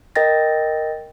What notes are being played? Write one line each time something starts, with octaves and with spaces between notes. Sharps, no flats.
A#4 D#5 G5 A6 A#6